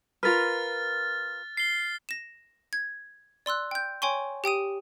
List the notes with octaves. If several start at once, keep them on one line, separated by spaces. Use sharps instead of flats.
F4 A#4 B4 F6 A6
C7 G7
A#6 E7
G#6
D5 C6 E6 F#6
G5 G6
C#5 G5 G#5 C6 C#6
G4 G5 D#6 D#7